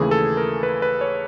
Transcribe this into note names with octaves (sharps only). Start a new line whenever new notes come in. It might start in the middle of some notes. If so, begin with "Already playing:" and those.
Already playing: D#2 C#3 E3 A3 G#4
A4
A#4
B4
B4
C#5